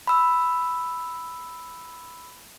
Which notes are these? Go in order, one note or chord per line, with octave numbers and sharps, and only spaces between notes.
B5 E6